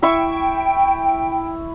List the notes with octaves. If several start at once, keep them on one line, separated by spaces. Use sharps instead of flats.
E4 E5 G5 C#6